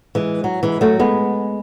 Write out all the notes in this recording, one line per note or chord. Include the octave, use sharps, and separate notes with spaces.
E3 G#3
F#3
E3 G#3
F#3 A3
G#3 B3